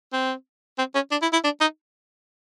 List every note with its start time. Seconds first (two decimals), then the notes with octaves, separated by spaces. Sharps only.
0.13 C4
0.79 C4
0.95 C#4
1.11 D4
1.22 E4
1.33 E4
1.44 D4
1.61 D#4